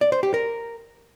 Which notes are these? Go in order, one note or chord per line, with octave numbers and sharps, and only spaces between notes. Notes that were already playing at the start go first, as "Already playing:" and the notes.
D5
C5
G4
A#4